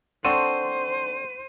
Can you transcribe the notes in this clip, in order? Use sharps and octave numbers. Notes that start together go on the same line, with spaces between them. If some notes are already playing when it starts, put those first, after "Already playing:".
C4 D4 A4 C5 F#5 C6 C#6 D#7